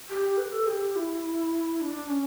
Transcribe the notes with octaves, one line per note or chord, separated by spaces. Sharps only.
G4
B4
A4
G4
E4
D4
C#4